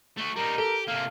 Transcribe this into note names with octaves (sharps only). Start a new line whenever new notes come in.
A3 F#4
G3 D#4 A#4
G4 A4
C3 A#3 F5